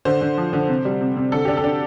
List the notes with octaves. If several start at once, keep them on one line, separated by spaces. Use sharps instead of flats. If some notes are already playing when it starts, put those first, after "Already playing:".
D3 C5
D3
F3
D3
C3
G3
C3
C3
D3 A4
D4 G4
A4
D4